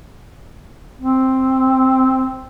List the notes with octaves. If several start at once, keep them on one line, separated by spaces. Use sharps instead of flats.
C4